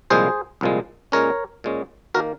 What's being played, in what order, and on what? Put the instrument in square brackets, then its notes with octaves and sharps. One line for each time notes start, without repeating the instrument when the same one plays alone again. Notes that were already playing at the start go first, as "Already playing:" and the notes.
[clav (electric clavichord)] C2 A#2 F3 G#3 G#4 C5
C2 A#2 F3 G#3
A#2 G#3 C#4 A#4 C#5
A#2 G#3 C#4
D#3 A#3 F#4 A#4